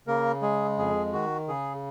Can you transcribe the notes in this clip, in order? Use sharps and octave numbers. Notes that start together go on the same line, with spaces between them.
C#3 A#3 A#4
G#3 G#4
F2 G#4
D#3 F#4
C#3 G#4